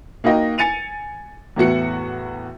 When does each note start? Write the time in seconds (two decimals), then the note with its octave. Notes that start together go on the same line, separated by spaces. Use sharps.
0.24 A#3 D#4 F#4 D#5 G5
0.58 G#5 A6 C#7 D#7 F7
1.56 E2 A2 B3 F#4 C#7